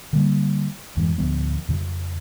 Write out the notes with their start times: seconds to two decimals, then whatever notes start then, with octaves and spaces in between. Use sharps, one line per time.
0.13 D3 G3 A#3
0.97 F2 G#2 E3 G#3
1.18 D1 D2 F3 B3
1.69 F2 C#3